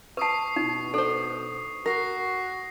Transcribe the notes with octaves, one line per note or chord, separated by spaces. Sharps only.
B4 A5 C#6 D#6 C7
B2 D#4
D4 A4 C5
F#4 A#4 A#6 C7